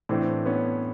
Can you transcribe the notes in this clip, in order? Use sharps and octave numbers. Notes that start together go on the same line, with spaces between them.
A2 E3 C4 D4
B3 C#4